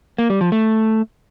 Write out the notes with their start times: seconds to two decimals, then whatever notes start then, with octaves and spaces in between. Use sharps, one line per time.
0.18 A#3
0.30 G3
0.41 F3
0.52 A3